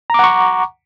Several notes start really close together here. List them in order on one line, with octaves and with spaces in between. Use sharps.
A#5 D6 F#5 C#6